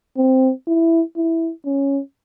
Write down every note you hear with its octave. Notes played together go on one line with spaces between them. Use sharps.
C4
E4
E4
C#4